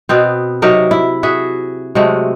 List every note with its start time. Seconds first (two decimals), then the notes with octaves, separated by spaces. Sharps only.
0.09 B2 B3 C4
0.62 C3 F#3 D#4 A#4
0.91 E4
1.23 F#4 G#4 E5
1.95 C3 F#3 G#3 A3